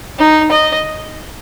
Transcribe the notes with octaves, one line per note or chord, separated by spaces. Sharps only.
D#4
D#5